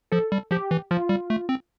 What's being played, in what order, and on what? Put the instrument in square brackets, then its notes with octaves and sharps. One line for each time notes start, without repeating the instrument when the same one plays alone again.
[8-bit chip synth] F3 [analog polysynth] A4
[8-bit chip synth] G3
[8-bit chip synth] F3 [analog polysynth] G4
[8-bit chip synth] E3
[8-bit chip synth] F3 [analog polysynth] F4
[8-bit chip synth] G3
A3
C4